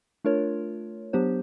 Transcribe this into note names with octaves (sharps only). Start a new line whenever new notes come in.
A3 D4 F4 A#4 C#5
F#3 B3 D4 G4 C5